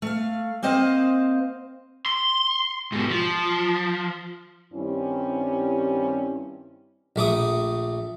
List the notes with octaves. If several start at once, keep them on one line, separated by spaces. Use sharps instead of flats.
A3 F5
A#3 C4 C5 D#5 F5 F#5
C6
G#2 B2
F3
G2 D#3 G3 C4 C#4 E4
A#1 A3 D6 D#6